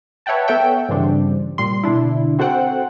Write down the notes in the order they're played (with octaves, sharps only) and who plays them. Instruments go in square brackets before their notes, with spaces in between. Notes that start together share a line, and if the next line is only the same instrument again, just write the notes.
[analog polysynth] B4 C#5 E5 F#5 G5 A5
B3 A4 C#5 E5 F#5 G5
G2 C#3 E3 G3 C4 D4
A#2 G3 C6
B2 D3 D4 E4
C4 F#4 A4 C5 F#5 G5